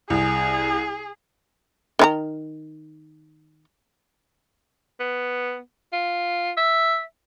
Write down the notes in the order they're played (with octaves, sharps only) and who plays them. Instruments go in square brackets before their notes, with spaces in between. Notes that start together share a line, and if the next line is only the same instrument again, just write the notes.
[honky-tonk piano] C2 [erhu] G#4
[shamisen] D#3 E4 A#5
[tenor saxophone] B3
F4
E5